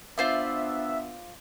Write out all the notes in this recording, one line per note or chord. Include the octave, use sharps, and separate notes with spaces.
B3 D4 F4 C5 D5 E5